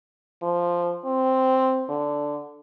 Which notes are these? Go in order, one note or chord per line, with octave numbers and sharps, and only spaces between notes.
F3
C4
D3